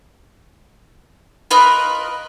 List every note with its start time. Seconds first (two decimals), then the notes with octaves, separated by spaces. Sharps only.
1.51 F4 A#4 B4 D#5